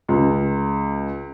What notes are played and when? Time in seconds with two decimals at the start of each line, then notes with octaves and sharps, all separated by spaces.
0.09 C#2